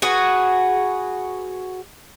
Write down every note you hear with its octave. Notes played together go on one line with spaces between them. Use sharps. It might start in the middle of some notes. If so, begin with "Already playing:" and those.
F#4 G#4 B4